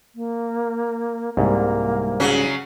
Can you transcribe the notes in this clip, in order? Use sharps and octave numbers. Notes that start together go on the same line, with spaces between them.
A#3
C2 G#2 A#3
C#3 F#3 C#4